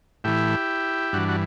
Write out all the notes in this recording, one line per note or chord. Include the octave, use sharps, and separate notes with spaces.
A2 E3 E4 G4
G2 E3 D4 F#4
F#4